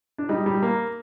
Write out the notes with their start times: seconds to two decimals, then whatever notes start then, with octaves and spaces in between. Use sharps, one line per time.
0.18 D4
0.29 G3 D#4
0.46 G3
0.63 A#3